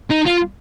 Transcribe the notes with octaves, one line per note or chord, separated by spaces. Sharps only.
D#4
F4